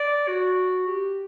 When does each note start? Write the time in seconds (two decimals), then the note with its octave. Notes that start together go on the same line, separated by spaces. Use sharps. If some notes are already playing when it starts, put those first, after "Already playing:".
Already playing: D5
0.28 F#4
0.87 G4